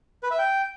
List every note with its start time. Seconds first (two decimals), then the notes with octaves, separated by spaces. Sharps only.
0.23 B4
0.31 E5
0.38 G5